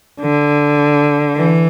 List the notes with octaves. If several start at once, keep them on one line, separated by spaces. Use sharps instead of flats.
D3
E3